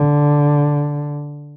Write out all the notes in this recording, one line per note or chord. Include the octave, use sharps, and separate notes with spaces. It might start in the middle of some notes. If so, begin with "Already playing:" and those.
Already playing: D3